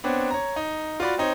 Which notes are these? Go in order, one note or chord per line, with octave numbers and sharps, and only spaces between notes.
B3 C4 D4 C#5
C#5 A#5
D#4
F4 F#4 D5 B5
C4 D#4 C#5